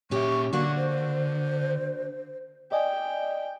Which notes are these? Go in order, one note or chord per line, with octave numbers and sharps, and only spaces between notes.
A#2 C#4 G4 E5 C#6
D3 A#3 D4 F#4 C#6
C5
D5 D#5 G5 G#5